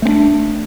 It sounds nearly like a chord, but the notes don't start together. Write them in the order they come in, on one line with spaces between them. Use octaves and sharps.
A3 C4 D4